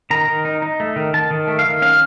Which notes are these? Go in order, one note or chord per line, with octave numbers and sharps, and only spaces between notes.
D#3 A#5
D#3
D#4
D#4
A3
D#3
D#3 A5
D#3
A3
F5
D#3
C#4 F5